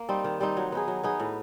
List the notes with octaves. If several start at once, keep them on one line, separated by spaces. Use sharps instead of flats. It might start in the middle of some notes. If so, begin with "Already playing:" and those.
Already playing: A#3
G3 C4 D#4
D#3
G3 C4 D#4
F#3
B3 D#4 G#4
F#3
B3 D#4 G#4
A2